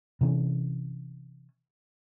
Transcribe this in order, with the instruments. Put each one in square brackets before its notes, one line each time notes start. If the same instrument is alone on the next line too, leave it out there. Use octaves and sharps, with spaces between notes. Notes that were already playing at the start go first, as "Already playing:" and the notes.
[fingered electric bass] C3 E3 C4 C#4